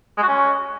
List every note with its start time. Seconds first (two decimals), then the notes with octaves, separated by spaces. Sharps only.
0.17 G#3
0.23 F#4
0.28 C#4